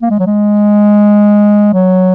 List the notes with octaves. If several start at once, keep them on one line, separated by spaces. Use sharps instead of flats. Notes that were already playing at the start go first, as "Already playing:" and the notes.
A#3
G#3
F#3
G#3
F#3